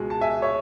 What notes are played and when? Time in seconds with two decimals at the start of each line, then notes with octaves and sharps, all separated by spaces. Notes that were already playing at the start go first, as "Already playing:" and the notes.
Already playing: C#2 B2 G#3
0.10 A5
0.21 E5 G#5
0.42 C#5 E5